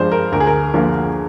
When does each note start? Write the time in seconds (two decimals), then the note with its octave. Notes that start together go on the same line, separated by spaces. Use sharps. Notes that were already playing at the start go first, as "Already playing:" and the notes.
Already playing: G2 F3 G#3 D4 C5
0.12 A#4
0.32 D2 A#4
0.40 G#4
0.47 A#4
0.74 D3 F3 A#3